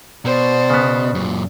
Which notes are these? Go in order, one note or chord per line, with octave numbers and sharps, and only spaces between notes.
B2 C5 D5
C#3 B3
F#2 A#2